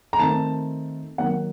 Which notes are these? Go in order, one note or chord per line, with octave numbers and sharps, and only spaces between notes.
A#5
D#3 A3 C4 A5
D#3 F#3 A#3 F#5